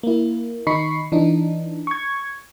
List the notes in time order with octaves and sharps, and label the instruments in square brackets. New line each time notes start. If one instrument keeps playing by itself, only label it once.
[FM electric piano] A#3 E4
D#3 D#4 B5 C#6 C7
E3 D4 D#4
C#6 G#6